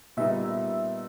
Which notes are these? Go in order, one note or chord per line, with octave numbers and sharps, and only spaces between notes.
A#2 G3 B3 D#4 E5